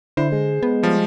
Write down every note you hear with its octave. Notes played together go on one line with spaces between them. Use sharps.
D3 E4 C5
G#3
B3
F3 G3